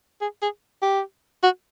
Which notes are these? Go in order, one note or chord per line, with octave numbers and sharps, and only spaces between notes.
G#4
G#4
G4
F#4